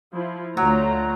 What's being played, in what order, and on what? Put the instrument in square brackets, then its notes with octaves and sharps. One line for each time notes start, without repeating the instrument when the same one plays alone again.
[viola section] F3 E4
[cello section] D2 [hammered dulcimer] F#3 [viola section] A3 F4 A#5